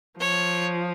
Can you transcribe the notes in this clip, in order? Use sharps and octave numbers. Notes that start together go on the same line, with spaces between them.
F3 C#5